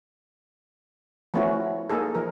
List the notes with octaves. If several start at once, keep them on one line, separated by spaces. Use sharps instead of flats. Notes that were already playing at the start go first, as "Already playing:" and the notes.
F3 A3 B3 C#4 E4 F#4
A#3 D#4 G#4 A4
F3 A#4